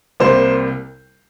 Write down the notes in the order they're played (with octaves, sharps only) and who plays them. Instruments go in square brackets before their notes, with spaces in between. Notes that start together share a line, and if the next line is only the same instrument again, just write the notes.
[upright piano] C2 C3 G3 A#3 C5